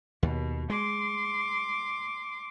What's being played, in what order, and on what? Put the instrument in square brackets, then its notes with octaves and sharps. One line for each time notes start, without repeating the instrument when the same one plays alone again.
[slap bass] D#2 [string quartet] B2
[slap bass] G#3 [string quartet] C6 D6